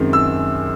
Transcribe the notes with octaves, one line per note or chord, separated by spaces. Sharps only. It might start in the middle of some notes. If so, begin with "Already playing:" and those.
Already playing: F#2 D#3 G#3 C4
E6